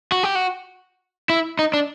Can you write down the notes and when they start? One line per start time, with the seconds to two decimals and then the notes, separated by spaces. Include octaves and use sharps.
0.12 F#4
0.23 G4
0.35 F#4
1.30 E4
1.59 D#4
1.74 D4